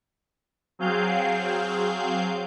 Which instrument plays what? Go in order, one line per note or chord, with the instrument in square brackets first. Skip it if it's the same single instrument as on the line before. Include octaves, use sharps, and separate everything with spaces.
[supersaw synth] F#3 C4 G#4 F5 G6